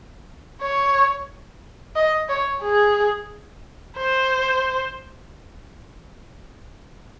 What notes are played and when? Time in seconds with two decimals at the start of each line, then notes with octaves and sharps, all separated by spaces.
0.61 C#5
1.96 D#5
2.29 C#5
2.63 G#4
3.97 C5